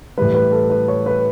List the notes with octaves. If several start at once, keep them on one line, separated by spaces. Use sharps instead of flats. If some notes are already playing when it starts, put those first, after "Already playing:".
A2 E3 G3 B4
B4
A4
B4
C#5
B4